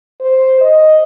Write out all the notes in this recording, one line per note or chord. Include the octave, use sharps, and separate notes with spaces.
C5
D#5